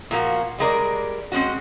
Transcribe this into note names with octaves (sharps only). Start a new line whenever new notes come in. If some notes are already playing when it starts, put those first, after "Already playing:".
A#2 F3 A#3 F#4
G3 G#3 A#4 D5
G#3 C4 C#4 F#4